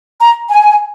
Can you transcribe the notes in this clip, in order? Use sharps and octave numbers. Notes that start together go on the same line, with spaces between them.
A#5
G#5